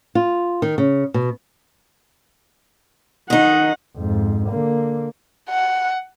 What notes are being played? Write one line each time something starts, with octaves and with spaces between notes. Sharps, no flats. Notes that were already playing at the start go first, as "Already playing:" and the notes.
F4
D#3
C#3
B2
D#3 D#4 F#5
F2 G#2
D3 A#3
F#5